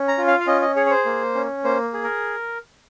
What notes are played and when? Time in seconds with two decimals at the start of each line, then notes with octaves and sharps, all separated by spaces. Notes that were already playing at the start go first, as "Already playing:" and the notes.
Already playing: C#4
0.08 A#5
0.18 F4
0.27 F5
0.40 F5
0.47 C#4 D#5
0.62 D#5
0.76 G#4 C#5
0.86 C#5
0.91 C5
1.06 A#3
1.35 C#4
1.64 A#3 C5
1.93 G#4
2.04 A#4